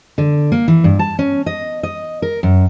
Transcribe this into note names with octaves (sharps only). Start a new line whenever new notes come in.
D3
A#3
E3
G2
A5
C#4
D#5
D#5
A#4
F#2